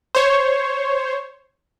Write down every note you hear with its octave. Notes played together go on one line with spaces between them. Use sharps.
C5 C#5